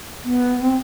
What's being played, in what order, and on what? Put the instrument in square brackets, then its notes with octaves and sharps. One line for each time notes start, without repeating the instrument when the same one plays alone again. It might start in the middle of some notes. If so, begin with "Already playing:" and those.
[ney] B3
C4